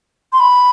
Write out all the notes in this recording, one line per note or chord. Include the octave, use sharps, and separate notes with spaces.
C6
B5